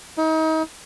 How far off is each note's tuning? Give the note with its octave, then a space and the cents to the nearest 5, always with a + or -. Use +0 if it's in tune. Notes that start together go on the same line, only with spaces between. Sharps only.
D#4 +35